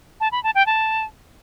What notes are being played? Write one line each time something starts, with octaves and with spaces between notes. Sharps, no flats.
A5
B5
A5
G5
A5